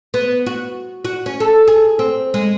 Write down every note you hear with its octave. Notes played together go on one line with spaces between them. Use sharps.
B3
F#4
F#4
C#4
A4
G#4
C4
G#3